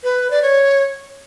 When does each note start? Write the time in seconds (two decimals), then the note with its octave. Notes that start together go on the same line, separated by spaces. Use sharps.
0.04 B4
0.31 D5
0.42 C#5